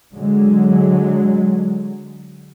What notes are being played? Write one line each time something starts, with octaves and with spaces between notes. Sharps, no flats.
D3 F#3 G#3